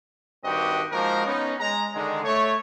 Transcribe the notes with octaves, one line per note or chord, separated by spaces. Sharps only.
G2 D#3 C4 F#4 G4 D#5
F3 G#3 A#3 D#4 F#4 A#4
B3 C#4 D#4
G#3 A#5
D3 D#3 G#3
A3 C#5